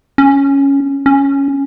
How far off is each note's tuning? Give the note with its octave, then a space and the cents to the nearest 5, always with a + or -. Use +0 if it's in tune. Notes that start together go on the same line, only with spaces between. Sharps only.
C#4 +0
C#4 +0